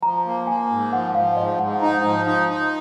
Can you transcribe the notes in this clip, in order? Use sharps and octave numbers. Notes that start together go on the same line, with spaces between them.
F3 A#5
A#3
A#3 G#5
G#2
F3 F#5
F3 F5
G#2 D#5
G#2 F#5
D#4 A#5
F3
D#4
D#4